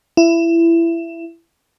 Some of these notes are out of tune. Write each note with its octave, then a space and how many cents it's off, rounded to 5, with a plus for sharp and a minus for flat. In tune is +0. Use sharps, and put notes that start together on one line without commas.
E4 +20